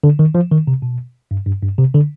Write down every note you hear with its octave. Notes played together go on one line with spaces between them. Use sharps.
D3
D#3
F3
D#3
C3
B2
G2
G2
G2
C3
D3